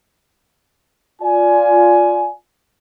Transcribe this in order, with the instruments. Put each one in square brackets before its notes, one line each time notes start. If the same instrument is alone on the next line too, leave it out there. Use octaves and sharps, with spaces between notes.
[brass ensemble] F4 D5 G#5